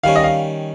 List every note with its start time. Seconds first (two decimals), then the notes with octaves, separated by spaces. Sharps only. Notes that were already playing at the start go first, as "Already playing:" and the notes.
0.03 D#3 G3 C#4 F5
0.16 D#5
0.24 F5